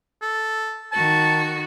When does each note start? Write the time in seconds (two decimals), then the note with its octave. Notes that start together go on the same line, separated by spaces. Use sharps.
0.22 A4
0.92 D#3 F#4 A5